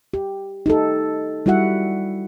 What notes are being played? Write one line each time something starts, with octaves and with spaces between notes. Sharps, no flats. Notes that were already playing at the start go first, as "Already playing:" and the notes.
G4
D#4 G4 A4
G3 E4 F#4 E5 F#5